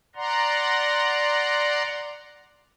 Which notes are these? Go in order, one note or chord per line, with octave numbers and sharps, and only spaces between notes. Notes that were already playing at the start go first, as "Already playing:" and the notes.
D5 F#5 A#5 C6